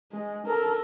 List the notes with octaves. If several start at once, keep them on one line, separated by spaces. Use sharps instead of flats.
G#3
A4 A#4